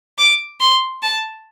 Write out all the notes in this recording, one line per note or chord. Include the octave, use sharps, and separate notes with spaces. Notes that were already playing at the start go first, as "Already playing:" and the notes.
D6
C6
A5